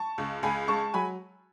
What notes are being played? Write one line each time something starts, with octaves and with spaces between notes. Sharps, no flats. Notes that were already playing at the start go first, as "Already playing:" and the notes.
Already playing: A5 C#6
C#2
C#2 G#5 B5
G#3 A5 C#6
F#3 G#5 B5